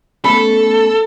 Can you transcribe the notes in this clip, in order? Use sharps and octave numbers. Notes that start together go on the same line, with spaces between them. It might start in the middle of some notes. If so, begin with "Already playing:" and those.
A3 B3 C#4 A4 B5